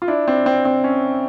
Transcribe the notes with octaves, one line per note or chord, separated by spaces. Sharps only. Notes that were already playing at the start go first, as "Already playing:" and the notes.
F4
D4 E4
C4 D4
C4
C4
C#4